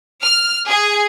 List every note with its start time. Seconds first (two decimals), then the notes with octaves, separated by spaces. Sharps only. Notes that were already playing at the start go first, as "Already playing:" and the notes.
0.22 F6
0.68 G#4